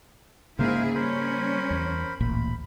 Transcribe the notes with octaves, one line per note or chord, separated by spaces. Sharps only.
G#2 C#3 A#3 E4 G#4 A#4 C5 F5
G3 C#4 A#4 C5 B5
E2
D1 A1 A#2 B5